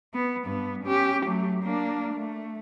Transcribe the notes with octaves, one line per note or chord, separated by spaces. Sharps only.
B3
G2 B3
C#4 G4
F#3 A3
A#3 D4
A3